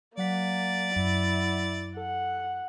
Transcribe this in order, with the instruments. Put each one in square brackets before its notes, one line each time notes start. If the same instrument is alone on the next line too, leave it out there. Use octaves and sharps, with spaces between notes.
[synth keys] F#3 F#5 B6 [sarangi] A#3 [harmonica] D5
[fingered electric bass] F#2 [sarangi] E4
[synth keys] A4 [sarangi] F#5